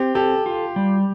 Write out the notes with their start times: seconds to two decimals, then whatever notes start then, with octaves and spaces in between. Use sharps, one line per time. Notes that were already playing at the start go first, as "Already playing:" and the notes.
Already playing: C4 G4
0.15 G4 A4
0.46 F4
0.76 G3